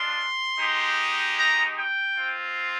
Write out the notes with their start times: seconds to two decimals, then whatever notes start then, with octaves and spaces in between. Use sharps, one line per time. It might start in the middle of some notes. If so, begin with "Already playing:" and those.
Already playing: G#3 D4 F4 C6
0.58 G#3 D#4 G4
1.38 A#5
1.78 G5
2.17 C4 F4